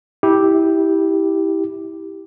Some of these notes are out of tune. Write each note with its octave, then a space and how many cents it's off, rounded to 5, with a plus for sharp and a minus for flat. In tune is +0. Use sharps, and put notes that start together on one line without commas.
E4 -20 G4 +0